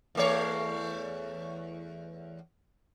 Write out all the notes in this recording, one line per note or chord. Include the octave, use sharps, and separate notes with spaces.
E2 A3 C#5